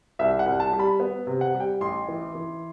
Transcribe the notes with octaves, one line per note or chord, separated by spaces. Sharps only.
C2 E5
F#5
C2
A5
G3
B5
B3
C3
F#5
G3
G5
A1 C6
E3
E3